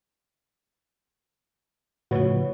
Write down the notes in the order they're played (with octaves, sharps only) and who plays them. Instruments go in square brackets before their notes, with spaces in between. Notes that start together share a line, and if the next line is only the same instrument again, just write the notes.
[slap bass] A2 C#3 F3 [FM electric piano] F#4 B4 C#5